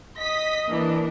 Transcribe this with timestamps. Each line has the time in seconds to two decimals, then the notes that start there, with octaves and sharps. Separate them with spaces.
0.20 D#5 D#6 B6
0.69 E3 A#3 D4